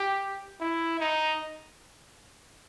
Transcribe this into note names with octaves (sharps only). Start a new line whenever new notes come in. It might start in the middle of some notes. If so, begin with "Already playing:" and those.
Already playing: G4
E4
D#4